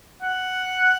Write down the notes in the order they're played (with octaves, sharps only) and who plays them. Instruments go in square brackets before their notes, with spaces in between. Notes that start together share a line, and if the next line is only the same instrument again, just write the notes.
[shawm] F#5